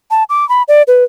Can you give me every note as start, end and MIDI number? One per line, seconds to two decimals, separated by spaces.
0.11 0.24 81
0.30 0.47 86
0.49 0.63 83
0.68 0.82 74
0.88 1.04 71